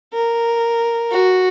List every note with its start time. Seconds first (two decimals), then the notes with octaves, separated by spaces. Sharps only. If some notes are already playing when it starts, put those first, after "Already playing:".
0.13 A#4
1.11 F#4